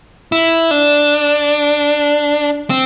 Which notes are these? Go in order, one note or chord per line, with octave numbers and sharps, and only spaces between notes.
E4
D4
C4